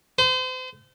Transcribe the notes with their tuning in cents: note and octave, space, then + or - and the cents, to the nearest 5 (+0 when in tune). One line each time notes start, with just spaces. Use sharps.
C5 -35